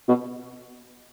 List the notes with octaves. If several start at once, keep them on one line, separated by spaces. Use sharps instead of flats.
B2